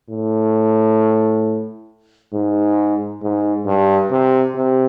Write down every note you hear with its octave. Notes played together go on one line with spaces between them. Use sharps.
A2
G#2
G#2
G2
C3
C3